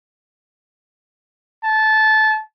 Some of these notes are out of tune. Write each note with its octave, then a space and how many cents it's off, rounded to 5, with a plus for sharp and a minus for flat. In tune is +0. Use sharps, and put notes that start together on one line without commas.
A5 -20